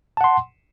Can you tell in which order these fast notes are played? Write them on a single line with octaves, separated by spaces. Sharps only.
A5 F#5 C6